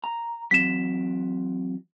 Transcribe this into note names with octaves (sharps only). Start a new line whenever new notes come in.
A#5
E3 F#3 C4 B6 E7